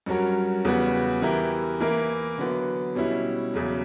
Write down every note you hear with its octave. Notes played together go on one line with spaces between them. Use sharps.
G2 F#3 C#4 F#4 A#4
E2 C#3 G3 B3 F#4
E3 B3 E4 G4 A#4
E3 A#3 E4 A#4
D3 F#3 B3
B2 G3 C#4 E4
E2 C#3 F#3